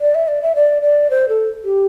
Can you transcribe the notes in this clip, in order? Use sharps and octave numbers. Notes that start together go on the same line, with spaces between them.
D5
E5
D5
E5
D5
D5
C5
A4
G4